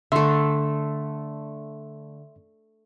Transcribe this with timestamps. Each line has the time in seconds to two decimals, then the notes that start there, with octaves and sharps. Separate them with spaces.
0.12 D3 A3 E5 C6